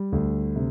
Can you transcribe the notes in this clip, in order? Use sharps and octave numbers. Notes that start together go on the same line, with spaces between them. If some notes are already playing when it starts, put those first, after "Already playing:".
Already playing: G3
D2
C3